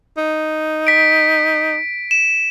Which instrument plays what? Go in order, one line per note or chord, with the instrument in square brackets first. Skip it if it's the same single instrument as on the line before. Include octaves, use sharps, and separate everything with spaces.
[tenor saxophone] D#4
[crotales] B6 D7
E7